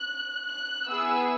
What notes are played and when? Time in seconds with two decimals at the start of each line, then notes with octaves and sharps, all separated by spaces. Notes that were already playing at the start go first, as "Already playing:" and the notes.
Already playing: F#6
0.48 F#6
0.88 B3 E4 G#4 E6